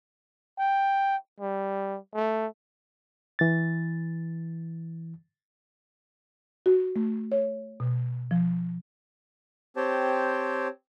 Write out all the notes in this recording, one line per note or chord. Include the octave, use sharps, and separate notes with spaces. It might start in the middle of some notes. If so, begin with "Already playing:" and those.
G5
G3
A3
E3 A6
F#4
A3
C#5
B2
F3
C4 G4 C5 C#5 G5 A5